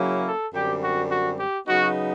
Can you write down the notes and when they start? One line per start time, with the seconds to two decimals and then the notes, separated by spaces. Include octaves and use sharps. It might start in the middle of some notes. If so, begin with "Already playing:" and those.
Already playing: C#3 F#3 A#3 C#4 E4
0.26 A4
0.53 F#2 D3 G3 C4 G4
0.82 F#4
1.10 F#4
1.38 G4
1.67 C#3 F#3 B3 D#4 F#4